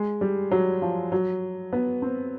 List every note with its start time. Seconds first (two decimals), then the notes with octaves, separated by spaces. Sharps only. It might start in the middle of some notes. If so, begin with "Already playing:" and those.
Already playing: G#3
0.21 G3
0.51 F#3
0.82 F3
1.12 F#3
1.73 B3
2.02 C4